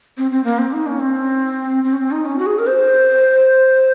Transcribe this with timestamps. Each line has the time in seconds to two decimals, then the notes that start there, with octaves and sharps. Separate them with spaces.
0.17 C4
0.31 C4
0.44 A#3
0.59 C4
0.73 D#4
0.86 C#4
1.00 C4
1.84 C4
1.93 C#4
1.98 C4
2.12 D#4
2.25 C#4
2.39 F#4
2.46 G#4
2.59 A#4
2.67 C5